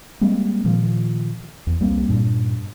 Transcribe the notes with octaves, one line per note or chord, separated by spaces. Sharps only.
G3 G#3 A#3 C4
A#2 D#3 F3
E2
C2 G3 A#3 C4
G2 A#2 D4